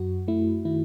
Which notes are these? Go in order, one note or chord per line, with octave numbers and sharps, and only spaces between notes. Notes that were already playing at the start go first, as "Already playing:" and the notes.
Already playing: F#2 F#4
A3 E4
D#3 E4